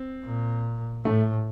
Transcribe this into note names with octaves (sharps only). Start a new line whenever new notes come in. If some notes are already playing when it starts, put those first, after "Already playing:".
Already playing: C4
A#2
A2 A3